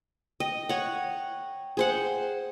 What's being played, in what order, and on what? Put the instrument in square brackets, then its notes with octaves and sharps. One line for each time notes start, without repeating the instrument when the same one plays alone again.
[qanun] D#5 [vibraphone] G5
[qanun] C#5 F#5
G#4 C5 F#5